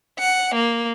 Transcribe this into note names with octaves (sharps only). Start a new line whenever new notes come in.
F#5
A#3